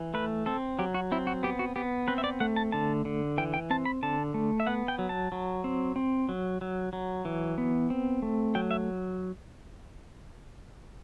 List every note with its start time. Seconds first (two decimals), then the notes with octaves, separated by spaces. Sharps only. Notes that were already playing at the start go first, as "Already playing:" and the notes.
Already playing: E3
0.14 A3 B4
0.46 C4 A4
0.79 F#3 G4
0.94 F#4
1.12 C4 E4
1.27 F#4
1.43 B3 G4
1.59 F#4
1.76 B3 G4
2.08 C4 B4
2.18 E5
2.24 D5
2.40 A3 F#5
2.56 A5
2.72 D3 A5
3.05 D3
3.38 E3 G5
3.54 G5
3.70 C4 A5
3.85 B5
4.03 D3 A5
4.34 A3
4.60 E5
4.67 B3 F#5
4.88 G5
4.99 F#3
5.09 A5
5.32 F#3
5.64 C4
5.96 C4
6.29 F#3
6.61 F#3
6.93 F#3
7.25 E3
7.58 B3
7.90 C4
8.22 A3
8.55 F#3 G5
8.71 E5